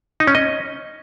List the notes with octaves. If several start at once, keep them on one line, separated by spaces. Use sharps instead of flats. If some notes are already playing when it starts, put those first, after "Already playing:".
D#4
C#4
D#5